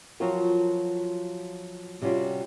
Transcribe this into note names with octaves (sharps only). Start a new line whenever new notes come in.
F3 F#3 C4 F4 F#4 A#4
C3 G3 C#4 F4 F#4